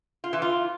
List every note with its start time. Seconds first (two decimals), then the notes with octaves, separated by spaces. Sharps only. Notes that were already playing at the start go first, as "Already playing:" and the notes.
0.24 F4
0.33 E3
0.42 F4